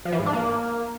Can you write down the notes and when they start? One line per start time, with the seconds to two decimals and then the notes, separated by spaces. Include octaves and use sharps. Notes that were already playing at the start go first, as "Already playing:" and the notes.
0.05 F3
0.12 E3
0.19 G#2
0.26 D4
0.33 A#3